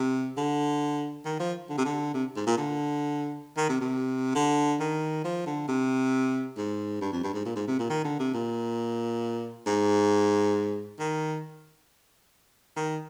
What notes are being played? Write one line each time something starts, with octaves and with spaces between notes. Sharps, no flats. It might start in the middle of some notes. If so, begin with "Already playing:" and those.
Already playing: C3
D3
D#3
F3
D3
C3
D3
C3
G#2
A#2
D3
D#3
C3
C3
D3
D#3
F3
D3
C3
G#2
G2
F2
G2
G#2
A#2
G#2
C3
A#2
D#3
D3
C3
A#2
G#2
D#3
D#3